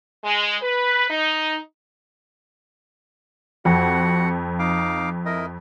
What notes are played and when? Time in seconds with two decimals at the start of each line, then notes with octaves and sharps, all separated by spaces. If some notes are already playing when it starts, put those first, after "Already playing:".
0.24 G#3
0.62 B4
1.10 D#4
3.65 F2 F#4 F#5
4.59 D#4 F5 D6
5.26 E4 A#4 D#5